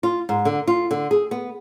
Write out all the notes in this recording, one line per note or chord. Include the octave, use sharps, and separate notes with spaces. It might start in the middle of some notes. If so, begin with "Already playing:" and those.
F4
G#2
D3
F4
D3
G#4
B3